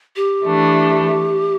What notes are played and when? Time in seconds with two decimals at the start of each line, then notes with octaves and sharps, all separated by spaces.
0.16 G4
0.45 E3 A3 D4